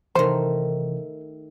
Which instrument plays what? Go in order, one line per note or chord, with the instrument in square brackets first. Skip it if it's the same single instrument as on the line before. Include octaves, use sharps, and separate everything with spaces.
[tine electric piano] C3 E3 [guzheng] D#3 A3 [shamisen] C5